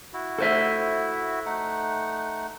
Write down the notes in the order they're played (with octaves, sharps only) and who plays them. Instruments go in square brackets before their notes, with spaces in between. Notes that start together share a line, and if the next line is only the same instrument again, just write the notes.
[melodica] E4 F#4
[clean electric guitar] A4 C5 E5
[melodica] A3 D#4 F#5